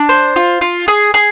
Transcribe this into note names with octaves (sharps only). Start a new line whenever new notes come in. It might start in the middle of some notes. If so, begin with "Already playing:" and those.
Already playing: D4
C5
F4
F4
G#4
G#4